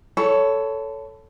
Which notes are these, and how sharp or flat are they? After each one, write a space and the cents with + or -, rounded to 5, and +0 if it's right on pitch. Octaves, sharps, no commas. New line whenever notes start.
A4 +0 C#5 +15 B5 +40